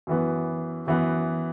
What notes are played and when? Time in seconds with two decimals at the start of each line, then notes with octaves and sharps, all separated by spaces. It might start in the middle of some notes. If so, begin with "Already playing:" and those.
0.07 F#2 E3 B3
0.87 F#2 E3 B3